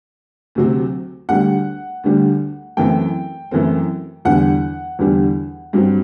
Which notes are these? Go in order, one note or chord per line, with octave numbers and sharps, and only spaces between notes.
D2 C3 F#3 C4
D2 D3 G3 F#5
D2 D3 G3
F#2 E3 A3 C4 G5
F#2 E3 A3 C4
E2 D3 G3 F#5
E2 D3 G3
G2 F#3 C4